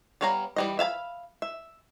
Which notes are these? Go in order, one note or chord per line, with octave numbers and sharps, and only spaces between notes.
G3 B3 C#5 F5 A#5
E3 G3 D#5
E5 F5 G#5 B5
E5